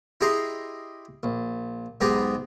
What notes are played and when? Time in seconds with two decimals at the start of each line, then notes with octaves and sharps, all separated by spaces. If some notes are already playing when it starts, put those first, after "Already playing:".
0.21 E4 G4 G#4 D#5 A#5 C6
1.23 A#1
2.01 B1 G#2 B3 G4 G#4 A#5